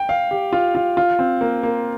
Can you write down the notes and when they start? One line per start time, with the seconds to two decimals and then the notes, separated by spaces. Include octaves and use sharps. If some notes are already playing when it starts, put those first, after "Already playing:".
Already playing: G5
0.09 F5
0.31 G4
0.53 F4
0.75 F4
0.97 F4
1.19 C4
1.41 A#3
1.63 A#3